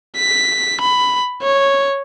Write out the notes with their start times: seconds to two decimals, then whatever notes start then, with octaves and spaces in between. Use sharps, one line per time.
0.16 B6
0.81 B5
1.42 C#5